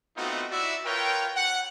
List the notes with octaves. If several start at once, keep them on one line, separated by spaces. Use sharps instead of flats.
A3 B3 C4 D#4 F4 F#4
E4 F#4 D5 E5
F4 A#4 B4 C#5 G5
F#5